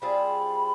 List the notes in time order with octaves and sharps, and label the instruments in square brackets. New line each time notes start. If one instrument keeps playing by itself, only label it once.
[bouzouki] G3 C4 F4 G#4 [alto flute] B5